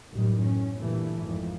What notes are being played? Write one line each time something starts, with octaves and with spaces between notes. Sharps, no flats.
A1 F#2 D#3 G3
C#4
G2 A#2 E3 A3
G#1 F2